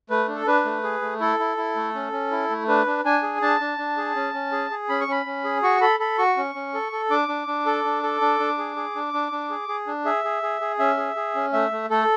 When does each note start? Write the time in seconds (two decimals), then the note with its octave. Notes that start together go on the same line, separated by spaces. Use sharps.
0.10 A3 B4
0.28 D4
0.35 A4
0.47 D4 B4
0.65 A3
0.83 G#4
1.02 A3
1.20 E4 A4
1.39 E4
1.57 E4
1.76 A3
1.94 C#4
2.12 C#4
2.31 E4
2.50 A3
2.68 D4 B4
2.86 D4
3.04 D4 G#5
3.23 G#4
3.42 D4 A5
3.60 D4
3.78 D4
3.97 G#4
4.16 C#4
4.34 C#4
4.52 G#4
4.70 G#4
4.89 C#4 B5
5.01 C#6
5.08 C#4 B5
5.26 C#4
5.44 G#4
5.62 F#4 C#6
5.81 A4 B5
6.00 A4 B5
6.18 F#4 C#6
6.37 C#4
6.55 C#4
6.74 A4
6.92 A4
7.10 D4 D6
7.28 D4
7.47 D4
7.66 A4
7.84 D4
8.03 A4
8.21 D4
8.40 D4
8.58 G#4
8.76 G#4
8.95 D4
9.13 D4
9.32 D4
9.50 G#4
9.68 G#4
9.87 D4
10.05 G#4 E5
10.24 G#4
10.43 G#4
10.61 G#4
10.79 C#4 E5
10.97 G#4
11.16 G#4
11.35 C#4
11.53 A3 E5
11.71 A3
11.90 A3 A4